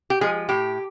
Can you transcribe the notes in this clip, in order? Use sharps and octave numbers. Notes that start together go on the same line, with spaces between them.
G4
F3 G#3 G#4
A2 G4